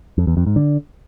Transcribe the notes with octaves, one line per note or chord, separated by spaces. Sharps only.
F2
E2
F2
G#2
D3